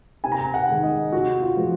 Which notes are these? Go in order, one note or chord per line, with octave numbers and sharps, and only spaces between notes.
C3 G#5
A#5
G#5
F#5
D#3 G#3
D#5
C3 F#4
F4
F3 G#3